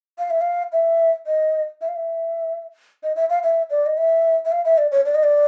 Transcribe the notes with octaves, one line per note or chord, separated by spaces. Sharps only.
F5
E5
F5
E5
D#5
E5
F5
E5
D#5
E5
F5
E5
D5
D#5
E5
E5
F5
E5
D5
C#5
D5
D#5
D5